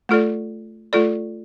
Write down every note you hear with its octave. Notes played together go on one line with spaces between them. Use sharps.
A3 F4 A4 D5
A3 F4 A4 D5